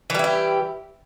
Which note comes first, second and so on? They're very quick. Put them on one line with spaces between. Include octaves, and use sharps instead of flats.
E3 G3 E4 G4